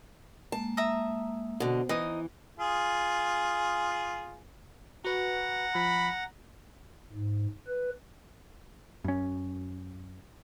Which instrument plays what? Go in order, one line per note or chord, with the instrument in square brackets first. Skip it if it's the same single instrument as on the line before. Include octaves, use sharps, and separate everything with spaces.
[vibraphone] G#3 A#3 [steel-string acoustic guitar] A5
[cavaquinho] E5 A#5 D#6
[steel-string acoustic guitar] B2 D3 [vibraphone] C5
[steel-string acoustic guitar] E3 [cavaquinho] D#4 D#6
[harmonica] F4 G#4
[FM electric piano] F#4 B4 [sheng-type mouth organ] F#5 A#5
[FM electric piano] F3 [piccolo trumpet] B5
[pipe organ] G#2
B4
[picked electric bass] F#2 C#4